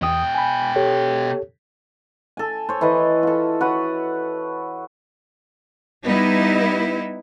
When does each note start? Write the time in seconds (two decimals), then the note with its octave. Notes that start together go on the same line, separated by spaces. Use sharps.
0.02 E2 B2 G5 D#6
0.35 G#5 B5
0.76 G4 A4 C#5
2.37 A4 G#5
2.69 C5 C#5
2.81 E3 A4 B4 D#5
3.23 F4 A4
3.61 F#4 B4 C#5
6.04 G3 B3 D#4 E4